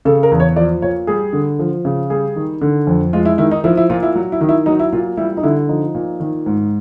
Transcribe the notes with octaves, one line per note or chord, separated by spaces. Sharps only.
C#3 A4
A#4
E2
C#5
F3 D5
A#2 C#5
G3 G#4
D3
F3
C#3
G3 G#4
D#3
D3
F2
G#3 F4
E4
D#3 E4
D#4
F3 E4
E4
A#2 F4
E4
F#3
E4
D#3
E4
F#3 D#4
E4
A#2 F4
G3 E4
D#4
D3 E4
F3 D#4
A#2
D#3
G#2